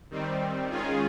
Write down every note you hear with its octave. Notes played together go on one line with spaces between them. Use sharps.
D#3 G3 C4
D#3 G#3 C#4 F4 G#4